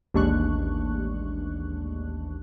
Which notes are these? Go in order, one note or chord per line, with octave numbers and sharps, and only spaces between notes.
A1 D#2 G#3 D4 C#6 F#6